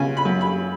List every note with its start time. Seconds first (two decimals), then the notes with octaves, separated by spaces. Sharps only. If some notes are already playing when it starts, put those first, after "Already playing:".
Already playing: C#3 B3 G#5
0.17 B5
0.25 F#2
0.41 B5